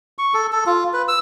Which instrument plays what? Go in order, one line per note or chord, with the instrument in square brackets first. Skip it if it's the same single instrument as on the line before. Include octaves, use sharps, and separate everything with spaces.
[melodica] C#6
A4
A4
F4
B4
E6